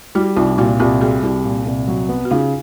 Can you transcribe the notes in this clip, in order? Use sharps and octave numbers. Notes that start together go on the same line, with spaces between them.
G3 E4 F#4
C2 D#4 F4
A#2 E4 F#4
C2 F4 G4
G3 F#4 G#4
C2 E4 F#4
A#2
C2
F#3
B3
F#4
C#3 D#4 F4